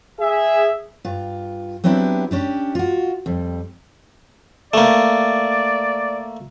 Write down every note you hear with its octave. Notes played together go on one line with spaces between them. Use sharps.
G#4 E5
G2 F4
F#3 B3 C4 D4 E4 G4
C#4 D4 G4
F4 F#4
F2 G3
A3 A#3 D5